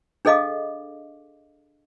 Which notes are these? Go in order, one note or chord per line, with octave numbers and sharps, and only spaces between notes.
D4 G#4 A4 D#5 F5 D6